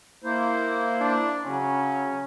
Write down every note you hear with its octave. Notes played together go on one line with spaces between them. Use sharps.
A#3 E4 C5
D4
C#3 F#3 C#4